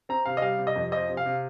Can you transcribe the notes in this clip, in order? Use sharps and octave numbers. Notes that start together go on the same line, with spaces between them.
C4 A#5
C3 F5
D#5
G3 F5
C3
D#5
F2
F3 D#5
C3
F5
C3